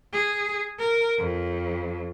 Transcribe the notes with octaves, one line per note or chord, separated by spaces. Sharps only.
G#4
A#4
F2